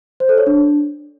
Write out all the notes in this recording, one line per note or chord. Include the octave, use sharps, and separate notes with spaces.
C5
A4
C#5
D4